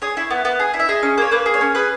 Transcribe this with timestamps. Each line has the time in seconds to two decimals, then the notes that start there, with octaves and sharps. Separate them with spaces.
0.02 G#4 C#5
0.17 E4
0.30 B3
0.45 B3
0.59 G#4
0.74 E4
0.79 E5
0.89 G#4 D#5
1.03 C#4
1.18 A#3 C#5
1.31 A#3 B4
1.46 G#4
1.54 C#5
1.61 C#4
1.75 G#4 B4